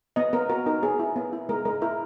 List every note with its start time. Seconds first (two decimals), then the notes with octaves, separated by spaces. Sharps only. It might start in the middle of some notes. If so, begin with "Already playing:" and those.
0.16 B3 D#5
0.33 B3 A#4
0.49 F#4 A#4
0.66 D#4 A#4
0.82 B3 G#4
0.99 E4
1.16 B3
1.33 E4
1.49 G#3 A#4
1.65 G#3 A#4
1.82 E4 A#4